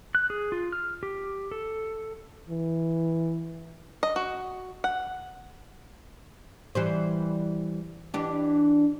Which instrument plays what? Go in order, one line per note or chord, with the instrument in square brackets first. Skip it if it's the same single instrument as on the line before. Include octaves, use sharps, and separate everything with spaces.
[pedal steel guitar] F#6
G#4
F4
F6
G4
A4
[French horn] E3
[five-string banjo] D#5
F#4
F#5
[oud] E3 G3 C5
E3 D4 G4